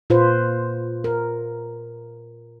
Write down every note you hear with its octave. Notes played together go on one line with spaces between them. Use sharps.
A#2 F4 B4 C5
A#4